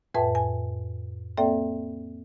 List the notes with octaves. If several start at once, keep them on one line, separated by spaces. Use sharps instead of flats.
F2 A2 B4 E5 G5 A5
G#5
A#3 C4 A4 D5 E5 G5